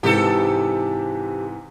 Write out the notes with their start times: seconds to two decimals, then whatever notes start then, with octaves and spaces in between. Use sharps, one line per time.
0.03 G#2 C3 E3 G4 A4